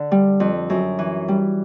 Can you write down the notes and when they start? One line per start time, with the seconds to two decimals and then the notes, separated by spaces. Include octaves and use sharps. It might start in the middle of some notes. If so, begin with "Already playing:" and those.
Already playing: D3
0.12 G3
0.40 F2
0.70 F#2
0.99 E3
1.28 G3